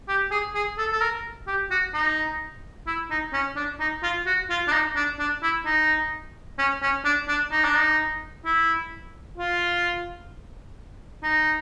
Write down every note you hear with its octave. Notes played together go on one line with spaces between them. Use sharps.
G4
G#4
G#4
A4
A4
A#4
G4
F#4
D#4
E4
D#4
C#4
D4
D#4
F4
F#4
F4
D4
D#4
D4
D4
E4
D#4
C#4
C#4
D4
D4
D#4
D4
D#4
E4
F4
D#4